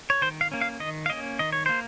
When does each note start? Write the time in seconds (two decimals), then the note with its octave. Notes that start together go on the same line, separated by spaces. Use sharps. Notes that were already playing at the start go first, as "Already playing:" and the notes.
0.10 C#5
0.22 D#3 C5
0.41 F5
0.52 A#3 C#4
0.61 F5
0.80 D#3 D#5
1.06 F5
1.10 A#3 C#4 D#5
1.39 D#3 D#5
1.52 C#5
1.66 A#3 C5